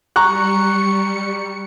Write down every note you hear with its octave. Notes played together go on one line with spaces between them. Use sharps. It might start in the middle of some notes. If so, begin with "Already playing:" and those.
G3 A#5 C#6 F#6 C#7